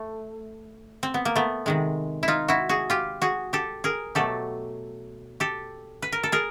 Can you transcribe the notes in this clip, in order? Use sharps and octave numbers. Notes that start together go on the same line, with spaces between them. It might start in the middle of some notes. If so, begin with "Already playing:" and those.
Already playing: A3
C4
B3
A#3
A3 B3
C3 D#3 G#3
E4
D#4 F4
E4 F#4
F#4 G#4
F4 G4
F#4 G#4
G4 A4
G#4 A#4
B2 F#3 A3 G4 A4
G4 A4
B4
A#4
A4
G#4 A#4